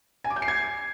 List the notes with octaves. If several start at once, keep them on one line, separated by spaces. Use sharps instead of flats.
G#5
D6
G6
C7
G#6